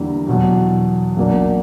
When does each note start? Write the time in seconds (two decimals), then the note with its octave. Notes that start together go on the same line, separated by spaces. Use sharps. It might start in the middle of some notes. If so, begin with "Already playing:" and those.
Already playing: E2 D3 G3 A#3 E4
0.27 E2 B2 F#3
1.17 B1 B2 A#3 D4